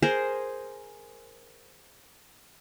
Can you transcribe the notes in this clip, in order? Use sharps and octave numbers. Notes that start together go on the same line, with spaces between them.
G#4 A#4 C5